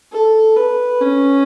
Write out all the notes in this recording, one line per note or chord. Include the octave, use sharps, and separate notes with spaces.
A4
B4
C#4